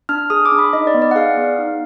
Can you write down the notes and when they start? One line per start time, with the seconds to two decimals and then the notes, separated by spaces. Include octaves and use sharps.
0.09 D4 F6
0.30 G#4 D#6
0.45 D6
0.52 D4
0.59 B5
0.73 D#4 D#5
0.87 D5
0.94 B3
1.02 D5
1.11 F#5
1.16 G#4 F5
1.37 B3
1.59 D#4